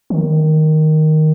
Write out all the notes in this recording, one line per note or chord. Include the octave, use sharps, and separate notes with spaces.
D#3